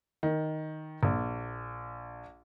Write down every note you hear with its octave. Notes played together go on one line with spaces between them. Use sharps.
D#3
A#1